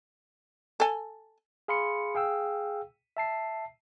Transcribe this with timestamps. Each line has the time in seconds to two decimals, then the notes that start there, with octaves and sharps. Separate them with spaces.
0.80 A4 G#5
1.68 G#4 F5 B5 C6 C#7
2.15 G#4 F5 G5 E6
3.17 E5 A5 C7